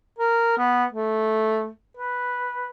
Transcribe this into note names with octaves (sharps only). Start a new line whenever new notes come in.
A#4
B3
A3
B4